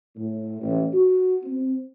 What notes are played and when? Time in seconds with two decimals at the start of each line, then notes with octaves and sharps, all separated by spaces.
0.17 A2
0.61 A1
0.93 F#4
1.43 C4